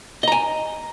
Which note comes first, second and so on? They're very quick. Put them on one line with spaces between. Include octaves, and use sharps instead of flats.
D#5 A#5 G#5